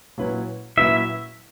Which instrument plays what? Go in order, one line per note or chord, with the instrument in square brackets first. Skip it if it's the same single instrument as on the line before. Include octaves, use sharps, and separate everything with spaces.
[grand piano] A#2 F#3 C#4 E4 B4
[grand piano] A#2 F#3 C#4 E4 B4 [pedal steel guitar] E5